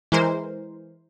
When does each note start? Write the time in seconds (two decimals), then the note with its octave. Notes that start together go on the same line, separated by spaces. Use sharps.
0.12 E3 G#3 A#4 C5